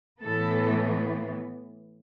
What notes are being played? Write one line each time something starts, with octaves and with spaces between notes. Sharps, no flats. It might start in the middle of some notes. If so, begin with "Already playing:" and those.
A2 E3 B3 A4